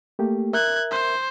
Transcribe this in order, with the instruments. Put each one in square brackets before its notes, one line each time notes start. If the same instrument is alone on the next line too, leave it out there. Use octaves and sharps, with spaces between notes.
[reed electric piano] A3 A#3 G4
[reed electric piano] A#4 E5 [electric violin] F#6 G#6
[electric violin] C5